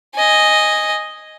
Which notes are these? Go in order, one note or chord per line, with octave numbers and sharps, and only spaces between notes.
D#5 G#5